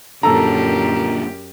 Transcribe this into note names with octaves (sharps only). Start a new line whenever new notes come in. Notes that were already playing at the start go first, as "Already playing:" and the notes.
F#2 A#2 D3 G4 A4 A#5